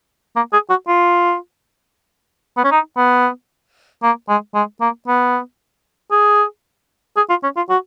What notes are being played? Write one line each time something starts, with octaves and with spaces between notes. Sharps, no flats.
A#3
G#4
F#4
F4
B3
C#4
D#4
B3
A#3
G#3
G#3
A#3
B3
G#4
G#4
F4
C#4
F4
F#4